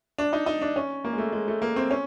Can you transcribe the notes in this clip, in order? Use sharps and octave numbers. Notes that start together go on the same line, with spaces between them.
D4
D#4
D#4
D4
C#4
A#3
G#3
A3
G#3
A3
A#3
C4
C#4